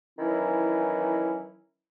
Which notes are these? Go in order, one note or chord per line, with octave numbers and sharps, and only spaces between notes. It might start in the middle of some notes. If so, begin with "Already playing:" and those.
D#3 E3 F#3 C#4 E4